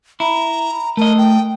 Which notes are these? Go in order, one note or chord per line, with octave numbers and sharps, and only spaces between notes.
E4 A#5
A3 A#4 D#5
G5